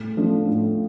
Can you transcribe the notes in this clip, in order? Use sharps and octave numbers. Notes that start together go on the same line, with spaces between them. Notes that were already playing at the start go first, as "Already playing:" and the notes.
Already playing: A2
F3 A3 D4 F4
A2